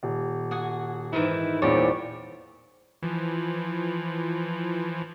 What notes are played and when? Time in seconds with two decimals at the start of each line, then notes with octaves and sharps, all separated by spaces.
0.03 D#1
0.51 F#4 G#4 F#5
1.13 G#2 D#3 E3 E4
1.62 E2 A#2 G3 C4 C#5 D5
3.03 E3 F3